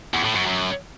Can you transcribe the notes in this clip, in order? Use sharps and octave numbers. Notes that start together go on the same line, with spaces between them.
E2
A2
F#2
F#2